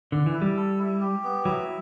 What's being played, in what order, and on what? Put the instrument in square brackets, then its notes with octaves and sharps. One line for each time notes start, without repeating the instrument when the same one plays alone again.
[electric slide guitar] D3 [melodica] D5
[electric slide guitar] E3
[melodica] E4
[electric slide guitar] G3
[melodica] A4
E4
G4
B3
[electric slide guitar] F#3 [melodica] E4